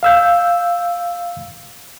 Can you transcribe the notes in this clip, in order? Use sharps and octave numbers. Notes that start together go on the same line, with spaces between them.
F5 E6 G6